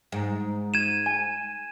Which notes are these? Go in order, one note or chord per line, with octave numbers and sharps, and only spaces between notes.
G#2
G#6 D#7 E7
G#5